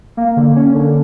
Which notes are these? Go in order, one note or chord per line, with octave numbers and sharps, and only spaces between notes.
A#3
D3
C#4
D3